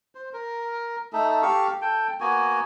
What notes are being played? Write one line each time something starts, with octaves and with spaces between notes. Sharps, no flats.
C5
A#4
A3 D#4 A4
G4 A4 F5 C#6
A4 G5
A#3 B3 F#4 G#5